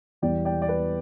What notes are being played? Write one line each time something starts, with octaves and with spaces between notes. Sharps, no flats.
E1 E2 E3 G3 B3 D5 G5
D5 G5
D5
B4